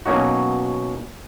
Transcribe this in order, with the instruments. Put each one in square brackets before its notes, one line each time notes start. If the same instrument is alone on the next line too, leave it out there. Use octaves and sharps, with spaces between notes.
[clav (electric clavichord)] B2 F#3 A#3 C#4 D#4 F#4